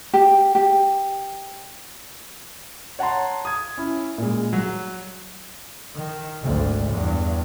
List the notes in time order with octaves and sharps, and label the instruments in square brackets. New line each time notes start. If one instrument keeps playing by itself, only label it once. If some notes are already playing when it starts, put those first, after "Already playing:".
[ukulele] G4
G4
[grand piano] C#5 F#5 A5 A#5 C6
D#6 G#6
C#4 E4
A#2 G#3
F#3
[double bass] D#3
G#1 D2
E2 G2